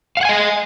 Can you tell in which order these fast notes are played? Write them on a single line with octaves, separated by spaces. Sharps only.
F5 F#5 G#5 D#5